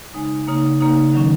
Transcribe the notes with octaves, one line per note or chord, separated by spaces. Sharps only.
C#3 G#3 D#4 G#5
C#3 A#3 D#4
C#3 A#3 D#4
D#3 F#3 C#4